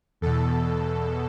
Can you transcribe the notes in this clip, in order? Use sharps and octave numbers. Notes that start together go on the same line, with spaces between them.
E2 B2 A4